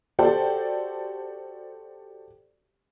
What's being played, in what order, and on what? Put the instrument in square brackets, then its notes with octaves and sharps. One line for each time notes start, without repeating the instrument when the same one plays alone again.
[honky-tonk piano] F#4 G4 A4 C5 D5 G5